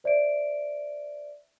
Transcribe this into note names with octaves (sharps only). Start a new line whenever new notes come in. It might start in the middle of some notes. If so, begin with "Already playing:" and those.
C5 D5 E5 D7